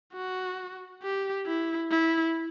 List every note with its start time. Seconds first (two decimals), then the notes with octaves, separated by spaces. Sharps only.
0.14 F#4
1.03 G4
1.46 E4
1.91 E4